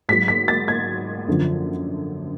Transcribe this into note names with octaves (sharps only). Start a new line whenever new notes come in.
G#2 F#3 B6
B6
A6
G#6
F#2 D3 F3